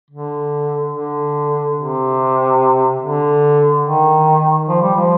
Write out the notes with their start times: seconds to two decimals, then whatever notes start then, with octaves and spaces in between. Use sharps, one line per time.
0.11 D3
0.94 D3
1.76 C3
3.02 D3
3.84 D#3
4.68 F3
4.82 G3
4.96 F3